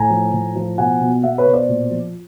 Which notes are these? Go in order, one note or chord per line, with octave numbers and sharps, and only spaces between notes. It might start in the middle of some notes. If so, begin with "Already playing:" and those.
Already playing: A2 G#5 A#5
F3
A2
F3
B2 F#5 G#5
B2
B2 E5 F#5
B4 C#5
B2
C5 D5
A#2
F3